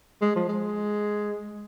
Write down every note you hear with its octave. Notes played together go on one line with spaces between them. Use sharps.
G#3
F3
G#3